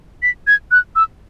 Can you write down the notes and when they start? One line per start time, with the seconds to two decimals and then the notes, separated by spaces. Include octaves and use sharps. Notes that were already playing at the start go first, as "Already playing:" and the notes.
0.23 B6
0.47 G#6
0.71 F#6
0.96 E6